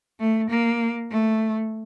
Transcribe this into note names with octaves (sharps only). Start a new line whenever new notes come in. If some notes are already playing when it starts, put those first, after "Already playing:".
A3
A#3
A3